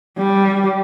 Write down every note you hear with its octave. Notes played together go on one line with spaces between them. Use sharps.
G3